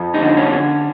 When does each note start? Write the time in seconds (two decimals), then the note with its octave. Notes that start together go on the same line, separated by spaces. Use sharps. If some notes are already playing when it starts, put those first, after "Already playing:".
Already playing: F2
0.14 D#4
0.22 D3
0.37 C#4